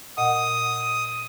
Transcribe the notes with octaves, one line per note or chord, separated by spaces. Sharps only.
A#2 D#5 F#5 D#6